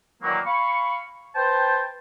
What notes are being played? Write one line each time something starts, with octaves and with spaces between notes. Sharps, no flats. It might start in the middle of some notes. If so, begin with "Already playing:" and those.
A#2 D#3 E3 F#3 A#3
F5 B5 C#6
B4 C5 G5 A5